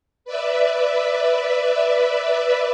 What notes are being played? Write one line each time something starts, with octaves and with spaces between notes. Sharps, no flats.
B4 D5 E5